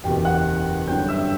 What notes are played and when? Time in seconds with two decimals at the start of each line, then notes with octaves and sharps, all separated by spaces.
0.04 F#1 E2 B2 G4 G5
0.25 F#5 F#6
0.87 G2 D3 F#3 G5 G6
1.09 E5 E6